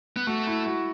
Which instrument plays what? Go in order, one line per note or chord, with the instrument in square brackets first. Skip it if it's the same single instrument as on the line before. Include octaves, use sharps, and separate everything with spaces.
[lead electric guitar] B3
[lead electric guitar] A3 [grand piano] F#4
[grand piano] E4
F#4